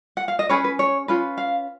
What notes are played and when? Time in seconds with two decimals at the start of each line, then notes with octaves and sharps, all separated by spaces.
0.17 F#5
0.28 F5
0.39 D#5
0.49 C#4 G#4 B4 C#5
0.64 B4
0.79 C#5
1.08 C#4 F4 B4
1.38 F5